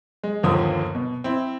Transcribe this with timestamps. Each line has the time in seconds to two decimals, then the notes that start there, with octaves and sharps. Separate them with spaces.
0.23 G#3
0.43 G1 D#2 D3 F3 D#6
0.95 B2
1.24 C4 E4